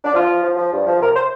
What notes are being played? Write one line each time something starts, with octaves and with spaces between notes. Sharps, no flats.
D4
F3 F4
F3
F3
F3
G2
F3
C3 A#4
C5